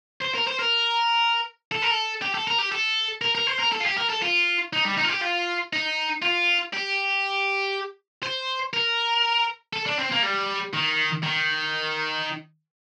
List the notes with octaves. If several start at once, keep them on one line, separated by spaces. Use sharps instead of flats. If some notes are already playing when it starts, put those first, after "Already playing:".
C5
A#4
C5
A#4
A4
A#4
A4
G4
A4
A#4
G4
A4
A#4
A#4
C5
A#4
A4
F4
G4
A#4
A4
F4
D#4
G3
D#4
F4
G4
F4
D#4
F4
G4
C5
A#4
A4
D4
C4
A#3
G3
D#3
D#3